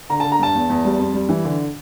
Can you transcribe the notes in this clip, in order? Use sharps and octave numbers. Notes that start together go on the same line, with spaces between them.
D3 A#5
A5
D3
A#5
G2 A5
E2
E2
G3
F2
G3
E3
D3